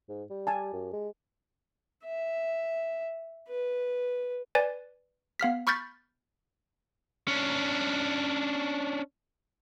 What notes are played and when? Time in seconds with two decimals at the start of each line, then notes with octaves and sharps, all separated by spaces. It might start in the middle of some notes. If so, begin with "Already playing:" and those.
0.09 G#2
0.30 G3
0.47 G4 G#5 A5
0.73 F#2
0.93 G#3
2.05 E5
3.49 B4
4.55 B4 D5 G#5
5.40 B3 F5 F6 B6
5.67 B5 C#6 F6 G6 A6 B6
7.28 C#4 D4